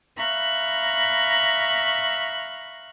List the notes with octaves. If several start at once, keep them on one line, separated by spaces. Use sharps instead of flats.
E5 F5 A#5 B5 C#6 F#6